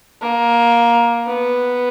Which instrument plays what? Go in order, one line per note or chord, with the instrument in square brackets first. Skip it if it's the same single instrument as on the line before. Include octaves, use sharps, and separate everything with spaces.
[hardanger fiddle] A#3
B3